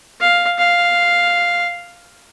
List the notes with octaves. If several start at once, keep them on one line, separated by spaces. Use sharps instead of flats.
F5
F5